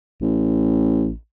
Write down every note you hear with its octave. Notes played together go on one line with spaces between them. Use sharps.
A1